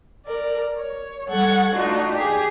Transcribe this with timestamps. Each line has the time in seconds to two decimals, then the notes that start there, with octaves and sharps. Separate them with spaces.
0.24 A#4 D5
0.78 C#5
1.28 G3 A4 F#5 C#6 G#6
1.73 A3 D4 D#4 F4 F#4
2.11 G4 G#4